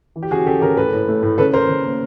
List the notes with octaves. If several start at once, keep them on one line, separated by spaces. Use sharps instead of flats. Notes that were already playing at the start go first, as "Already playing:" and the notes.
E3
G4
C#3 F#4 G#4
C#3 G4 A4
C#3 G#4 A#4
A2 A4 B4
A2
A3
A2
C#3 A4 B4
C#3 A#4 C5
C#3
A#3